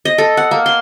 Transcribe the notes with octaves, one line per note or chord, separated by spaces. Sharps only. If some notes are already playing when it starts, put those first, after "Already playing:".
D#5
A4
F#5
A#3
C6